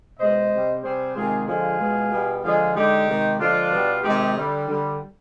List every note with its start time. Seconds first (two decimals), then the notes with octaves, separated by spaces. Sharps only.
0.19 B2 G#3 C5 D#5
0.52 C3 G3
0.83 C3 G3 G#4 C5
1.15 C3 D#3 G#3 F4 G#4
1.48 D3 F3 G#3 F4 G#4
1.80 B2 G#3
2.12 B2 G3
2.43 D3 F3 G#3 F4 G#4
2.75 D3 G#3 D#4 G4
3.08 C3 D#3 G#3
3.39 D3 F3 G#3 D4 F4
3.71 B2 G3
4.03 C3 D#3 G#3 D#4 G4
4.36 D3 G3
4.68 D3 G3